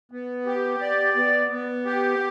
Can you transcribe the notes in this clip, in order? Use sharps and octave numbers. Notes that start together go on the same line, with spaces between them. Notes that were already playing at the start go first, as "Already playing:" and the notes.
B3
G4
D5
B3
B3
G4